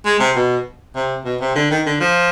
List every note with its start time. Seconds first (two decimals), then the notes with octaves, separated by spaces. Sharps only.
0.05 G#3
0.20 C3
0.35 B2
0.96 C3
1.25 B2
1.40 C3
1.55 D3
1.70 D#3
1.86 D3
2.00 F3